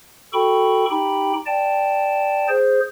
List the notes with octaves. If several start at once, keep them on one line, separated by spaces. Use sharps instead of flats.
F#4 A4 G5 B5 C#6
D#4 G4 G5 B5
D5 G5 A5
G#4 C5